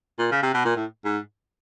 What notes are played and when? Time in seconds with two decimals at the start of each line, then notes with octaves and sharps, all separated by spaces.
0.19 A#2
0.32 C#3
0.43 C3
0.54 B2
0.65 A#2
0.76 A2
1.05 G#2